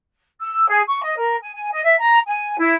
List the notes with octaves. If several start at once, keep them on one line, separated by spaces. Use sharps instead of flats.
E6
G#4
C#6
D#5
A#4
G#5
G#5
D#5
E5
A#5
G#5
E4